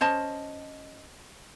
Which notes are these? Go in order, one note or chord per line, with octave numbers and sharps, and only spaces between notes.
C#4 C5 D#5 A5